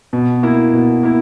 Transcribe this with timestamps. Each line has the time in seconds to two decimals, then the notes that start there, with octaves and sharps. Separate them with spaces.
0.13 B2
0.43 A#3 E4
0.73 B2
1.03 A#3 E4